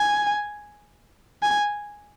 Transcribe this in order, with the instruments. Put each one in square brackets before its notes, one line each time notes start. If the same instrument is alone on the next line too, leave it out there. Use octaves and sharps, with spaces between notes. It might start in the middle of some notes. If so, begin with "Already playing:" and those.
Already playing: [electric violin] G#5
G#5